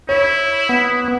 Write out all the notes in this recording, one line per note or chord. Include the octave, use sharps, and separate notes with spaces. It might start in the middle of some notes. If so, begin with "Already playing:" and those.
E4 C#5
B3